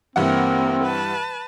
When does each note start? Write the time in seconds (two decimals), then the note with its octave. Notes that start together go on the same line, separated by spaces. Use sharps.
0.16 G2 E3 A#3 C4 A#4 F#5
0.84 B4 A5